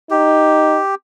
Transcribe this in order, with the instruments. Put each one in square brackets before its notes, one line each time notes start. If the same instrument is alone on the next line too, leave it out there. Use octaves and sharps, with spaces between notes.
[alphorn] D#4 [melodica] G4